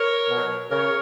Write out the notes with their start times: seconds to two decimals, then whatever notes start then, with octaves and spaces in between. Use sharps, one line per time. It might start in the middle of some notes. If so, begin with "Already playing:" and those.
Already playing: A#4 C#5
0.29 B2 F#3
0.70 C#3 A#4 C#5